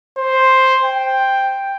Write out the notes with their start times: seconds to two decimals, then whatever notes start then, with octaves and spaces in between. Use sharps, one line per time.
0.17 C5
0.84 G5